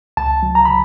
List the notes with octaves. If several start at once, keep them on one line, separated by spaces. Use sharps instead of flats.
C#2 A5
F#3
A#5
C#3 B5